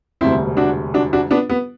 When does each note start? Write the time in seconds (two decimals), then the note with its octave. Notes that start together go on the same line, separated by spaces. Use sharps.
0.21 E1 D2 C3 G3 C4 E4
0.57 D4 F#4
0.94 D4 F#4
1.13 D4 F#4
1.31 B3 D4
1.49 B3